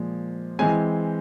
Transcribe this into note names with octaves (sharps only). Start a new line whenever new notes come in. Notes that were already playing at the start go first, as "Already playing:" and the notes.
Already playing: A#2 F3 G#3
E3 G#3 C4 G#5